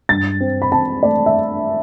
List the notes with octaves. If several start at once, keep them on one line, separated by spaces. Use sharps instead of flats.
G2 A6
C4
B5
C4 A5
A3 D5
E5